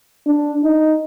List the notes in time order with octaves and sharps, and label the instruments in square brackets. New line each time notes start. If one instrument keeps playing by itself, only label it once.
[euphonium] D4
D#4